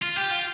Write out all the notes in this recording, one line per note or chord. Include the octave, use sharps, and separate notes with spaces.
F4
G4
F4